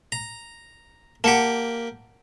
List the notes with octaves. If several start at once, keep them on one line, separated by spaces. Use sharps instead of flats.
A#5
A#3 G4 F#5 A5